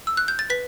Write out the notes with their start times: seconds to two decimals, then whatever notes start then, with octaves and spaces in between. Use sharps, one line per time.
0.07 E6
0.17 F#6
0.28 G6
0.39 A6
0.50 B4 B6